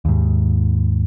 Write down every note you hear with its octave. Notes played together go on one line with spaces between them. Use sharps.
D#2 G#2